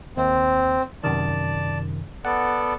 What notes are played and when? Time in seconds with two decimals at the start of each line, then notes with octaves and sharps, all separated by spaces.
0.17 D#2 C4
1.04 F#2 C3 D#3 D5 A5
2.25 B3 A4 D5 F#5